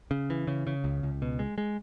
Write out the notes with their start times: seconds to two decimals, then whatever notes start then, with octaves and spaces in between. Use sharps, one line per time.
0.11 C#3
0.30 E3
0.47 C#3
0.67 C#3
0.84 C#2
1.03 C#2
1.22 B2
1.39 G#3
1.58 G#3